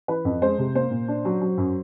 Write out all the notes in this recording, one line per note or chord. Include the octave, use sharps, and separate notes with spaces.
E3 B4
F2
G#3 C5
C3
A#3 C5
A#2
D4
F#3
F#3
F#2